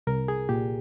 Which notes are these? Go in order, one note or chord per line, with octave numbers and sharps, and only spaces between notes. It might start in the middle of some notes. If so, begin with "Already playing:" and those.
C2 A#4
G#4
A#2 G4